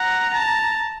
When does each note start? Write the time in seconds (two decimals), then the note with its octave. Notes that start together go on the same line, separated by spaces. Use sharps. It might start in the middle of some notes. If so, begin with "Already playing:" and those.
Already playing: F#5 A#5
0.34 A5